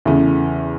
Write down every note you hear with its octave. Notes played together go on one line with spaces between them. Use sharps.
E2 C#3 E3 A3 C#4